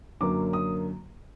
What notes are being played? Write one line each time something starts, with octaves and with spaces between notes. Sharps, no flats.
F#2 D3 F#3 A#3 D6
D#6